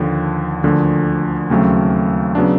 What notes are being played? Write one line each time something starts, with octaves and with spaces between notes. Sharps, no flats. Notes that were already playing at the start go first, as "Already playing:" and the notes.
Already playing: D#2 D3 F3
D2 D3 F3 A#3
D#2 C#3 F#3 A3 C4
C#3 F#3 B3 D4